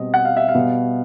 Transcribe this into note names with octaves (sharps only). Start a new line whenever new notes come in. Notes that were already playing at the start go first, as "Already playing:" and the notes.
Already playing: B2 G3 C4 D#5
F#5
F5
E5
F5
B2 G3 B3